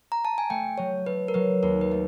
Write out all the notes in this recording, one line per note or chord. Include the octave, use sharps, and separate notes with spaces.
A#5
A5
G#5
A3 G5
F#3 C#5
A3 B4
A#4
F#3 B4
D#2 A#4
B4
A3